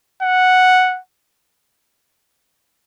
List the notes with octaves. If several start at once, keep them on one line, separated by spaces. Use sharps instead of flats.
F#5